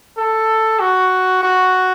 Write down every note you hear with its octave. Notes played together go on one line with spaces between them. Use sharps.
A4
F#4
F#4